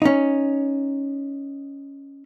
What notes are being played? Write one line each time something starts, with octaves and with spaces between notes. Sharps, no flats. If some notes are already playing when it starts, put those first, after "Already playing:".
C#4 D#4